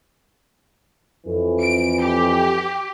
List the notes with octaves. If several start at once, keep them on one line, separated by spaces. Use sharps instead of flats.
F2 E3
D7
G4